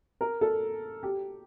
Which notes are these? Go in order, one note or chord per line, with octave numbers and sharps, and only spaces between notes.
A#4
A4
G4